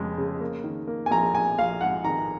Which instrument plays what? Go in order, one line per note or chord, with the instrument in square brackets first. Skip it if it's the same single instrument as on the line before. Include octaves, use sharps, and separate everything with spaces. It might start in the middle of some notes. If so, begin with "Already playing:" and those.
Already playing: [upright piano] F1 F2 C#3 G#3
C#3
A#3
D#3
A#3
G#5
A#1 A#5
A#1 G#5
A#1 F5
G#2 F#5
D#3 A#5